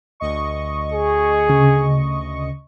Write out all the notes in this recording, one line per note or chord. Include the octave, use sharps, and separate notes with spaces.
D2 D#5 C#6
G#4
C#3